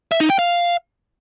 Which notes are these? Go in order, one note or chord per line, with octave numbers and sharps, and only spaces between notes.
E5
D#4
G5
F5